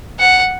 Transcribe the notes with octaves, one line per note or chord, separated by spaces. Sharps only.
F#5